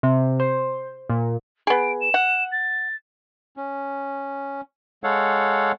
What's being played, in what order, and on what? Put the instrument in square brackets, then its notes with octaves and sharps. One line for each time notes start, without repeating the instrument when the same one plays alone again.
[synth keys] C3
C5
A#2
[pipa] B3 G#4 [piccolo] D7
[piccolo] E7
[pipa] F#5
[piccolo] A6
[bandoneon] C#4
G#3 A4 C#5 F5 F#5